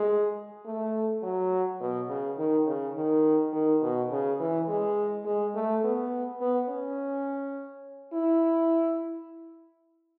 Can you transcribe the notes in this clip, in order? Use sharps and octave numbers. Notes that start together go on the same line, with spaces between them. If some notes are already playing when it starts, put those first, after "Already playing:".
Already playing: G#3
A3
F#3
B2
C#3
D#3
C#3
D#3
D#3
B2
C#3
E3
G#3
G#3
A3
B3
B3
C#4
E4